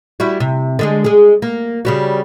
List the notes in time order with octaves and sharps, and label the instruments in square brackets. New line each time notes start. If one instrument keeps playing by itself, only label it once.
[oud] G3 E4 F#4
C3
D3 G#3 G#4
G#3 G#4
A#3
C#3 G3 F#4